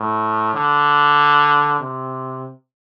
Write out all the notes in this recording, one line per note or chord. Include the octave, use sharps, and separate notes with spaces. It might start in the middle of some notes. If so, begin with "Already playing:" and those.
Already playing: A2
D3
C3